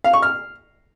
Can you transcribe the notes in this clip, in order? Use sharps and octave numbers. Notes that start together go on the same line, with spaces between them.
F5
C#6
F6